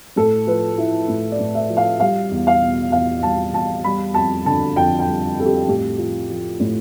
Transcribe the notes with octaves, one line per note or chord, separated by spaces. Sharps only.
A2 A4
F3 B4
F3 E4
A2
D5
A2
E5
F3
F5
G3 F5
E2
F5
B2
E2 F5
G3 A5
E2 A5
G3 B5
F2 A5
D3 A5
F2 G5
G5
G3
F2 A4
G4
A2 G4
F3
F3
A2